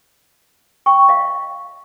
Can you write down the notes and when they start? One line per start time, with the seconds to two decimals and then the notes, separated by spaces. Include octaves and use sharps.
0.86 G5 C#6
1.09 D#5 F5